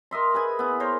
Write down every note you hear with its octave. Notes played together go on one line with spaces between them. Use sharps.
A#4 D#5 E5 C6
G#4 B4 G#5
B3 E4
A#4 C5 C#5